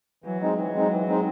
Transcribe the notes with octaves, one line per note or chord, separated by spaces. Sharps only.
E3 F#3
G#3 C4 D#4
E3 F#3
G#3 C4 D#4
E3
G#3 C4 D#4